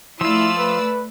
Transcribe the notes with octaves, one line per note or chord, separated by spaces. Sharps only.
F3 A3 E4 F4 D5 E6
B4